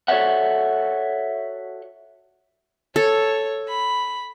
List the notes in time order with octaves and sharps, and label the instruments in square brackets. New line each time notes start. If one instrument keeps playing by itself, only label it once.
[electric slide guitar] F#4 A4 C#5 D5 E5 F#5
[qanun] A4 [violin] C#5
[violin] B5